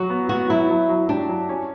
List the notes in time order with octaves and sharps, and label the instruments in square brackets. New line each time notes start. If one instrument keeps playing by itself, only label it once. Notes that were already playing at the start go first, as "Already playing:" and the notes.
Already playing: [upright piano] F#3 [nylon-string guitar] F#4
[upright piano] B3
[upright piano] B3 [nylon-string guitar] F#4
[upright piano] F#3 [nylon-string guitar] E4
[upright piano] F#3
F#3
[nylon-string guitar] D4 [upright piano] G4
[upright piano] F#3
C#4